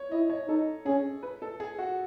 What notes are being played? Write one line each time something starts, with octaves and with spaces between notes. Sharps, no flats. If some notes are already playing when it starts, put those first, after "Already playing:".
Already playing: C#5
E4 D#5
C#5
D#4 A4
C#4 G#4
B4
A4
G#4
F#4